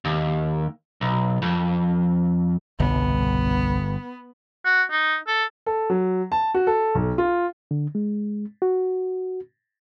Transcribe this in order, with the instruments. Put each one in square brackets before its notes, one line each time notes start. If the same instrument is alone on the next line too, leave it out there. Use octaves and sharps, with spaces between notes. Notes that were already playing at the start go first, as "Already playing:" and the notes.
[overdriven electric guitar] D#2
B1
F2
[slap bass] G1 [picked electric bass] C2 B2 G3 [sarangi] B3
[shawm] F#4
D#4
A4
[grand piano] A4
F#3
A5
F#4
A4
B1
F4
[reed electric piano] D3
G#3
F#4